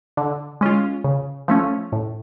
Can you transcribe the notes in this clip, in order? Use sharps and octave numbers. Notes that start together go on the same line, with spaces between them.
D3
G#3 C#4 F4
C#3
F3 A3 C#4
A2